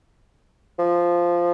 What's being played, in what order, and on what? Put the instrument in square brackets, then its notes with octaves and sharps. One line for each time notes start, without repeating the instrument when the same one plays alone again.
[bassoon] F3